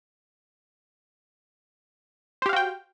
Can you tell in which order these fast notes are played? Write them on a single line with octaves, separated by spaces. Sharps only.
C5 G4 F5 F#4 G5